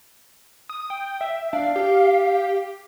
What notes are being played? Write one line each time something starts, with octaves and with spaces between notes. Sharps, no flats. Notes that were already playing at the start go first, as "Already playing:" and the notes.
D#6
G5
E5
D4 F5
G4